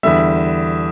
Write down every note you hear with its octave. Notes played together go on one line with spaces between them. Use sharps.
E2 D3 G3 E5